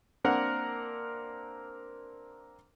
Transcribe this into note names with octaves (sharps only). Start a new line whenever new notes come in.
A#3 C4 D4 A#4 F#5